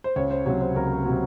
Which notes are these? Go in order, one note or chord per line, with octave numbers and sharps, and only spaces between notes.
C5
C#2 C#5
C5
C3 F#3 C#5
C5
C#2 A#4
C3 F#3